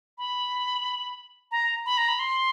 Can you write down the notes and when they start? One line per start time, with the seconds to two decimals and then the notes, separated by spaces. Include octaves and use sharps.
0.18 B5
1.51 A#5
1.86 B5
1.97 A#5
2.08 B5
2.19 C6